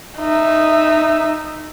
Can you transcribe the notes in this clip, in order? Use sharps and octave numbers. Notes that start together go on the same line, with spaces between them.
D#4 E5